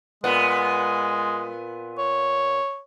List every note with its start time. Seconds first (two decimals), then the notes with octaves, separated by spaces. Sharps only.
0.24 A#2 G#3 B3
1.98 C#5